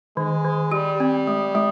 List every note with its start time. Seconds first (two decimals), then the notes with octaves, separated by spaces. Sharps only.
0.17 D#3 G#3
0.45 D#3
0.72 G3 G4
1.00 C4
1.27 G#3
1.55 G#3